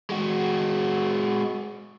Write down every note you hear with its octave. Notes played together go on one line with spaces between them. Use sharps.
G#3 F#4